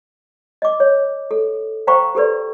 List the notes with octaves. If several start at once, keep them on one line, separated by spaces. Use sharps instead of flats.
D#5 D6
C#5
A4
C5 F5 G5 A#5 B5 C#6
G4 A4 B4 D5